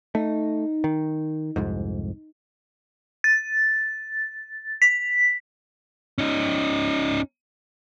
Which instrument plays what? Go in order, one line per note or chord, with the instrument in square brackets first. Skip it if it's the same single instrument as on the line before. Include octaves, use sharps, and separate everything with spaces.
[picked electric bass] A3 [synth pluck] D#4
[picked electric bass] D#3
C2 F2 G#2
[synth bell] A6
B6
[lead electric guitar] C#4 D#4